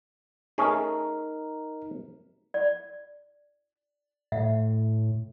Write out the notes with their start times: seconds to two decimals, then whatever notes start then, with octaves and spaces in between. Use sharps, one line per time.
0.58 A3 C#4 D#4 G#4 A#4
2.54 D5
4.32 A2 E5